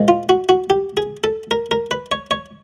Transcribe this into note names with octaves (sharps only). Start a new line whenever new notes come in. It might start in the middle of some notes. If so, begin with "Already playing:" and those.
Already playing: A#2 F3 G#3
F4
F#4
F#4
G4
G#4
A4
A#4
A#4
B4
C#5
C#5